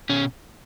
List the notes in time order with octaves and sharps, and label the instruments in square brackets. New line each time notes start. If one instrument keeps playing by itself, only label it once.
[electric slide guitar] B2 C#4